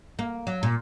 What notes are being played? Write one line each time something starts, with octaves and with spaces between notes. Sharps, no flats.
A#3
F#3
A#2